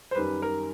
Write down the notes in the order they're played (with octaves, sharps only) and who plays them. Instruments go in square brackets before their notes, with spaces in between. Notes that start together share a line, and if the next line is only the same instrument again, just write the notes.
[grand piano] C5
F#2 D#3 G3 B4
A#4